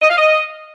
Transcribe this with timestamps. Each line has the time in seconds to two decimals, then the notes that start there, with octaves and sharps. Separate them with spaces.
0.02 D#5
0.09 F5
0.17 D#5